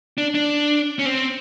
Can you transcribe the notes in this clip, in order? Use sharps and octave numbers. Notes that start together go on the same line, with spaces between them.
D4
D4
C#4
C4